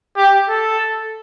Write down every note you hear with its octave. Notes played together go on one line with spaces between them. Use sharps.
G4
A4